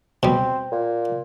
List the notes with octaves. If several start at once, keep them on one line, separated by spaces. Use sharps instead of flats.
B2 G3 C4
A#2